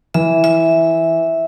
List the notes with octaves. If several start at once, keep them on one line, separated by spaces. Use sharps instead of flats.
E3 E5
E5